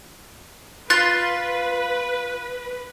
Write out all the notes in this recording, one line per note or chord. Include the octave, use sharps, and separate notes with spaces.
F4 B4 F#6 A6